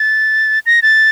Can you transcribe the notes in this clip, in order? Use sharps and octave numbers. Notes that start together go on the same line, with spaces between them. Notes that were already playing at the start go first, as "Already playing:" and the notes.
Already playing: A6
A#6
A6